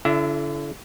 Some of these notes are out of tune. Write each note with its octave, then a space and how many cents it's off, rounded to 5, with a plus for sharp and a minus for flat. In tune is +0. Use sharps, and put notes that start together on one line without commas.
D3 -25 E4 +40 E5 +0